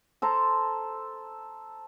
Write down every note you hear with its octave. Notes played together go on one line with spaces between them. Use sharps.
A4 C5 A5 A#5